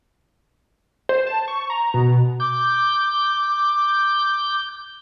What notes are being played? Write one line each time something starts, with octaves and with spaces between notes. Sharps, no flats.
C5
A5
C#6
A#5
B2
D6 G6